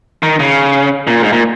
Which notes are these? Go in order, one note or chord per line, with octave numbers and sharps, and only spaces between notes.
D#3
C#3
A#2
G#2
A#2